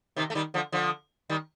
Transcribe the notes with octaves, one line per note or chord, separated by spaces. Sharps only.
C3 D#3
A3
D#3 G3
D3 F3
D3 F3
D#3 G3